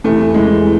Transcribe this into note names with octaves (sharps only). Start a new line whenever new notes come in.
E2 C3 E3 A3
E2 C3 E3 G#3